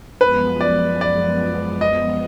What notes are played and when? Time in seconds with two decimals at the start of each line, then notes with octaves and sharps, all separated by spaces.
0.21 F#2 F3 G#3 B3 B4
0.61 D5
1.01 D5
1.81 D#5